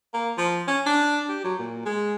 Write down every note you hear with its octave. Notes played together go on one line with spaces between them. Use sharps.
A#3
F3
C#4
D4
G4
F#3
A#2
G#3